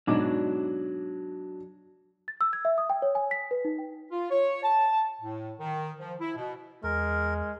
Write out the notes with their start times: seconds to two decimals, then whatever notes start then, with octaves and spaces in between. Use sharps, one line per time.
0.07 G#2 B2 F#3 D4 D6
2.28 A6
2.41 E6
2.53 G#6
2.65 E5
2.78 D#6
2.90 G5
3.02 C#5
3.15 G#5
3.31 B6
3.51 B4
3.65 D#4
3.79 G5
4.11 F4
4.30 C#5
4.63 A5
5.21 A2
5.60 D#3
5.99 F3
6.21 E4
6.36 B2
6.84 E2 G#3 A#4